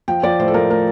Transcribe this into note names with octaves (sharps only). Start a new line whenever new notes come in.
F3 G5
F3 D5
A2 C5
A4
F3 A#4
A3 A#4